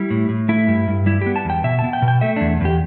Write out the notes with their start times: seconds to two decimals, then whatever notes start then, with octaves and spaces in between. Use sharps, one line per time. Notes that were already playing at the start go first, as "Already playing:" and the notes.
Already playing: G3 E4
0.11 A2
0.29 A2
0.49 A3 E4
0.68 G2
0.88 G2
1.06 G3 E4
1.21 B3 G4
1.36 A5
1.45 E2 G5
1.64 B2 E5
1.79 A5
1.84 B3
1.93 G5
2.02 B2
2.08 G5
2.21 A3 E5
2.36 E2 D4
2.61 E2 G4